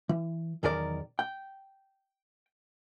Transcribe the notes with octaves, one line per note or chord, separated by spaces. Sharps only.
E3
B1 E2 D#3 A#4 D5
G5